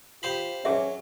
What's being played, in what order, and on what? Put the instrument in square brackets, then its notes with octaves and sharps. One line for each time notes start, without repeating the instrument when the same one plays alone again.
[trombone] F4 [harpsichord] G4 C5 B5
[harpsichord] F#3 [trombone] C#4 [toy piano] G#4 E5